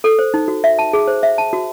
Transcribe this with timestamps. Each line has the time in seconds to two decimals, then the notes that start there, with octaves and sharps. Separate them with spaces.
0.04 A4
0.19 C5
0.34 D#4
0.48 F#4
0.64 E5
0.79 A5
0.93 G#4
1.08 C5
1.23 E5
1.38 A5
1.53 F#4